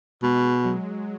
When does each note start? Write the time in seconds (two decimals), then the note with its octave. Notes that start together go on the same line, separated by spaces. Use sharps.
0.22 B2 G#3
0.64 F#3